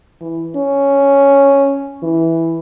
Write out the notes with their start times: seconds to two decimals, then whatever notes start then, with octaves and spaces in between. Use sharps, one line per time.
0.21 E3
0.56 C#4
2.03 E3